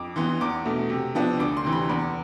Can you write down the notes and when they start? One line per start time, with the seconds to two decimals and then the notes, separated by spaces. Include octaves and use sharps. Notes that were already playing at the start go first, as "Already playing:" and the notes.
Already playing: F2 D6
0.16 E3 B3 C6
0.41 E2 D6
0.65 B2 A3
0.90 C3
1.15 F3 B3 D4
1.40 D2 D6
1.57 C6
1.65 C3 E3
1.73 B5
1.89 E2 B5